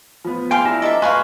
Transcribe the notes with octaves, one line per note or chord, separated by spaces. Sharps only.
F3 B3 F4 C5
G#4 F5 G5 G#5 B5 C6 D6
D4 E4 F#4 A#5
A4 D#5 E5 D6 D#6
F#4 G#4 A#4 B4 F5 G#5 C6 C#6